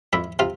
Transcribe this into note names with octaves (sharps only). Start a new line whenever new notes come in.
F2 E4 E5
C3 F4 F5